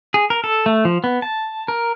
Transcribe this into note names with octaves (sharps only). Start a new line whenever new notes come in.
G#4
A#4
A4
A3
F3
B3
A5
A#4